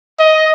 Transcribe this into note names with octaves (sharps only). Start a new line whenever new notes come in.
D#5